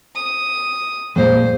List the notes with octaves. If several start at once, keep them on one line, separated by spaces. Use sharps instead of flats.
D#6
F2 A#2 G#3 C5